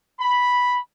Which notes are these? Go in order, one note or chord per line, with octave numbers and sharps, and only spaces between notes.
B5